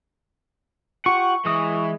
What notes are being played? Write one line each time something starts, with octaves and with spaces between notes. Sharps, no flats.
F4 G4 F#5 C#6
E3 G#3 D#6